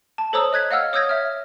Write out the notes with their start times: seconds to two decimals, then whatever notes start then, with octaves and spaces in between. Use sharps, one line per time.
0.18 A5
0.33 A4 C5 C#5 A#5 D#6 E6
0.53 D#5 F#6 G#6 B6
0.71 D#5 F5 F#5 E6 F6
0.93 C#5 D#6 E6 G6 G#6 A#6
1.09 E5 F6